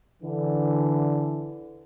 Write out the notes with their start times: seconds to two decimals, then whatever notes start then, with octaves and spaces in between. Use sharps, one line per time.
0.21 D3 E3